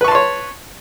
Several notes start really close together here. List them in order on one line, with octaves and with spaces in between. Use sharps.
B4 C#6 A5 C6 C#5